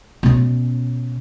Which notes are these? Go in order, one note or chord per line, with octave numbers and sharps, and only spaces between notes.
B2 C#4